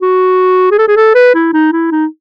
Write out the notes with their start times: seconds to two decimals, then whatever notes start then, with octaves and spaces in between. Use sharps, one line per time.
0.02 F#4
0.71 G#4
0.78 A4
0.88 G#4
0.96 A4
1.15 B4
1.34 E4
1.53 D#4
1.72 E4
1.91 D#4